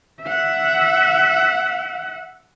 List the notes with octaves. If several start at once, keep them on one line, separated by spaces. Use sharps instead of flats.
E5 F#5